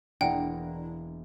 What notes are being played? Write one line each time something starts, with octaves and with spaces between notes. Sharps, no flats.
E1 A#3 D4 E4 F#5 G5 A#5